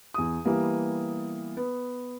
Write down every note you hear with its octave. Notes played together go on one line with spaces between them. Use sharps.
E2 D#6
E3 G3 A#3 B3
B3